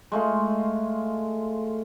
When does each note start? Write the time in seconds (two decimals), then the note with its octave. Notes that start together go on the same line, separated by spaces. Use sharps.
0.12 G#3 A3 F4